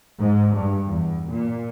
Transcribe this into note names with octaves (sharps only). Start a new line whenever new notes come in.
G#2
G2
E2
A#2